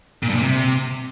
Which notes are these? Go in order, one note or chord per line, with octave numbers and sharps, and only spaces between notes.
A#2
G2
A#2
C3